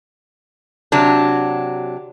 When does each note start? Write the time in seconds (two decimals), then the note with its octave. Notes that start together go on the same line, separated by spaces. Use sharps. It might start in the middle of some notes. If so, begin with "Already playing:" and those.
0.92 C3 F#3 D4